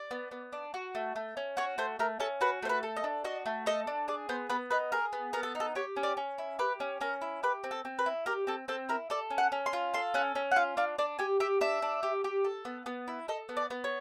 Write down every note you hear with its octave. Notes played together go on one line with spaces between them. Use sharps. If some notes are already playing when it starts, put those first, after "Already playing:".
Already playing: D5
B3
B3
D4
F#4
A3
A3
C#4
F#4 C#5
A3 C5
A3 A#4
C#4 A4
F#4 B4
A3 C5
B4
A4
D#5
D4
F#4 D#5
A3
A4 D#5
D4
G#4 D5
B3 C5
B3 B4
D#4 B4
G#4 A#4
B3
B3 A#4
A4
D#4
A4
G4 C#5
C#4
D5
C#4
E4
G4 B4
C#4
C#4 A#4
E4
G4 B4
C4
A4
C4
B4
E4
G4 A#4
C4 A4
C4 A4
E4 A#4
A4 D5
C#4
F#5
C#4
C6
F4
A4 C6
C#4 F#5
C#4
F#5
F4 F5
D4 F5
D4 D5
G4 G#5
G4 E5
D4 E5
D4
G4
G4
A4
B3
B3
E4
A4 D#5
B3
D5
B3
C#5